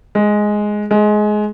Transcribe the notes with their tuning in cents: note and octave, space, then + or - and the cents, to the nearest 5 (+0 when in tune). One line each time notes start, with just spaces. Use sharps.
G#3 +5
G#3 +20